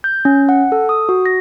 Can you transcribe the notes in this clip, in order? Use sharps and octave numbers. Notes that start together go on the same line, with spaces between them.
G6
C#4
F#5
A4
D#6
F#4
A#6